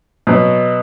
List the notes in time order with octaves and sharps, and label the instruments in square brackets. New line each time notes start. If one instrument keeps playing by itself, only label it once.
[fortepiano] B2 F#3 B3